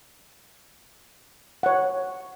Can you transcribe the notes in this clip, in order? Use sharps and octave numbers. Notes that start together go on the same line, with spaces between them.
C#5 F#5